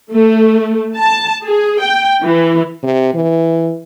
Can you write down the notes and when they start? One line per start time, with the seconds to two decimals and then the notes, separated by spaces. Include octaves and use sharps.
0.13 A3
0.96 A5
1.45 G#4
1.82 G5
2.24 E3
2.83 C3
3.14 E3